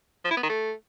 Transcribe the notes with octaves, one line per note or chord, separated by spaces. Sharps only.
F3
E4
B3
D#3
A3